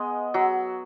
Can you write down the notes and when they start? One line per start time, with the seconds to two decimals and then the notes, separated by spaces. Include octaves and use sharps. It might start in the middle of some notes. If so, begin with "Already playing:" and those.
Already playing: G#3 B3
0.34 F#3